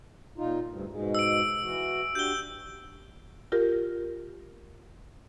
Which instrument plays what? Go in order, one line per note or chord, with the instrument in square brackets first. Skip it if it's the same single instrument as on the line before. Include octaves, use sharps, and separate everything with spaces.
[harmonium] A#2 D#4 F4
D2 G2
G#2 B2 G#3
[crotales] E6 D7
[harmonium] E3 F#4
[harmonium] D4 F#4 G4 [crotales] G6 G7
[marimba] F4 G4 A#4